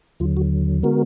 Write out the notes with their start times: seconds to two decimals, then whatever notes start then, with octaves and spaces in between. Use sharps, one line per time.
0.20 D#2 D3 F#3 F4
0.37 F#4
0.83 D3 G#3 B3 F#4 A#4